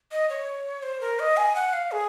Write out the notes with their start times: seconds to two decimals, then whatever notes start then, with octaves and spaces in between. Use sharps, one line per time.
0.11 D#5
0.29 C#5
0.83 C5
1.01 A#4
1.19 D#5
1.37 G#5
1.55 F#5
1.73 F5
1.91 G#4